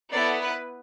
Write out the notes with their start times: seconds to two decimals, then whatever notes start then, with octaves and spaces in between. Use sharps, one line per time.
0.12 B3 E4 A4 D5
0.42 B4